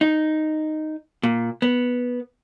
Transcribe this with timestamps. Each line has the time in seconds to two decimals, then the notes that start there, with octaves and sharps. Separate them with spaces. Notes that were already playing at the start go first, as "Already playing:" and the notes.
0.01 D#4
1.23 A#2
1.62 B3